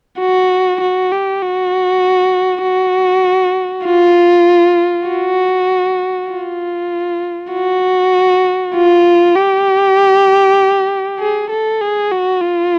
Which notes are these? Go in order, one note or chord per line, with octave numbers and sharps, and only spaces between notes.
F#4
F#4
G4
F#4
F#4
F4
F#4
F4
F#4
F4
G4
G#4
A4
G#4
F#4
F4